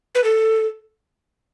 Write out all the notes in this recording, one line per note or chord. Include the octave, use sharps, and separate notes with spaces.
B4
A4